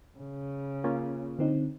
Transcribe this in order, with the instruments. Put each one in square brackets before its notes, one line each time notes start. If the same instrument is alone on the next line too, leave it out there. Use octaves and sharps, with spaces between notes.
[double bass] C#3
[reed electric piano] A#3 C#4 F4
[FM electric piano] D3 C4 D#4